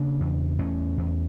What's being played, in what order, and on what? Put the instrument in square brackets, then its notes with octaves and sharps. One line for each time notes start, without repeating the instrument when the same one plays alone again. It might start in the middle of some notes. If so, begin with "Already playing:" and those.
Already playing: [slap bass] C#3 A#3 D4
E2
E2 A3 C#4
E2